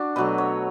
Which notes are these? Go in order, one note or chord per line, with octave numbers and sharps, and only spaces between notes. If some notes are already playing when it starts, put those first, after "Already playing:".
Already playing: D4 F#4
B2 F#3 A3 B4
C#5